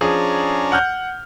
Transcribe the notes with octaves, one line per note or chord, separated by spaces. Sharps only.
F3 C#4 D4 G#4 A#5
F#5 F6 G6